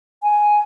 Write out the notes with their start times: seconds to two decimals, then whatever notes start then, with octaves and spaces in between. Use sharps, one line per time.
0.23 G#5